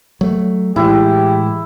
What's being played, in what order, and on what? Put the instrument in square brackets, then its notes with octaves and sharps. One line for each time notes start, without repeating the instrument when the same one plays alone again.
[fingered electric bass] F#3 A3
[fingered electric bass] A2 E3 G#3 [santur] E4 [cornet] G4